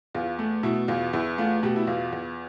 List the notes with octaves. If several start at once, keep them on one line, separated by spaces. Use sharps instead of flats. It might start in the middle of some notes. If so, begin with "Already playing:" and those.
E2 F4
A3
B2 E4
E2 F4
E2 E4
A3 F4
B2 G4
E4
E2 F4
E2